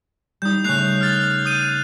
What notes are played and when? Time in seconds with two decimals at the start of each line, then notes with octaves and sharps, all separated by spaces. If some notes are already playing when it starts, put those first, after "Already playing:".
0.42 G3 D#4 D#6 G6
0.64 C#3 A3 F#6 C7 F7
1.01 F6 A6
1.45 D#6 G6 D#7